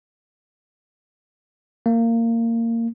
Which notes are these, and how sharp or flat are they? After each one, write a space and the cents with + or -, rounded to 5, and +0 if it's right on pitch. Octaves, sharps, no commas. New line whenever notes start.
A#3 -20